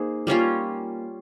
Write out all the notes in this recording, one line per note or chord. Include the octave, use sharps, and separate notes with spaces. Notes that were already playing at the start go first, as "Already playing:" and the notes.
Already playing: A#3 D#4 G#4 C5
G3 A#3 C#4 F4